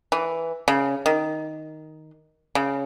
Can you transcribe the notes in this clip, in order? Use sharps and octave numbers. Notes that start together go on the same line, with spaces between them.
E3
C#3
D#3
C#3